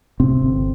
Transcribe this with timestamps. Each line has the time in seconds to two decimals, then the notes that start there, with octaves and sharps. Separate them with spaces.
0.20 C3 C4
0.42 G1